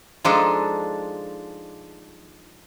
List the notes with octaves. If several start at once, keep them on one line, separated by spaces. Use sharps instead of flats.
F3 G#3 D4 D#4 A4